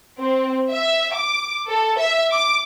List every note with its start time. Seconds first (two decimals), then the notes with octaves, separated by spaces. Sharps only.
0.18 C4
0.71 E5
1.14 D6
1.68 A4
1.98 E5
2.31 D6